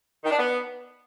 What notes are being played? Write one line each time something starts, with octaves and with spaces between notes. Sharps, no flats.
D#3
D4
B3